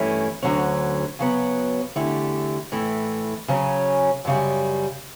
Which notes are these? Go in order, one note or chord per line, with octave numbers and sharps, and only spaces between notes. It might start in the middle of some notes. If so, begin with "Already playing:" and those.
Already playing: G2 E3 A3 C#4 E4
D2 D3 F#3 C#4
C#3 F#3 B3
E2 D3 A3 E4 G4
A2 E3 A3
C#3 F#3 C#4
F#2 C#3 G3